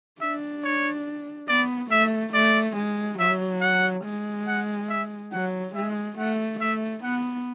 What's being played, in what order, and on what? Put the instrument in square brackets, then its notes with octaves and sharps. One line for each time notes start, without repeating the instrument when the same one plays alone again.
[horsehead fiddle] D4 [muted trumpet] E5
[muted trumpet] C#5
[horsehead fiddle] B3 [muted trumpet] D5
[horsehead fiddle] A3 [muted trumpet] E5
[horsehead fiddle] A3 [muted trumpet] D5
[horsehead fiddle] G#3
[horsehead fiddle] F#3 [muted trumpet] E5
[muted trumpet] F#5
[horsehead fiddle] G#3
[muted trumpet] F#5
E5
[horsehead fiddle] F#3 [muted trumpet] F#5
[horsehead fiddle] G#3 [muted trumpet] E5
[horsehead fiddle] A3 [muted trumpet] F#5
[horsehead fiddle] A3 [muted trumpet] E5
[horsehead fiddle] B3 [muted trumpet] F#5